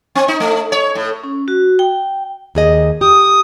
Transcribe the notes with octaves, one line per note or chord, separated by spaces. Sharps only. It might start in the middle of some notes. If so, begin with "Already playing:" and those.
C4
D#4
A3
C#5
A2
C#4
F#4
G5
D#2 G#4 D#5
G4 D#6